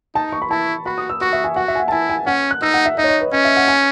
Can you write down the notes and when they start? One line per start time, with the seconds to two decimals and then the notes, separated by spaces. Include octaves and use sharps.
0.14 D#4 A5
0.32 C#6
0.42 B5
0.50 E4 A5
0.86 F#4 B5
0.98 D#6
1.09 E6
1.21 F#4 C#6
1.33 E5
1.44 G#5
1.56 F#4 F#5
1.68 E5
1.75 G#5
1.80 F#5
1.88 A5
1.92 E4 G#5
2.09 G#5
2.26 C#4 F#5
2.51 F#6
2.62 D#4 E6
2.74 F#5
2.86 E5
2.97 D#4 D#5
3.04 C#5
3.09 D#5
3.21 B4
3.33 C#4 D#5
3.45 E5
3.57 F#5
3.68 G#5